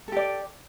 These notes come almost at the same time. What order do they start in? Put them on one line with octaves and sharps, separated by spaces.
A4 G4 D5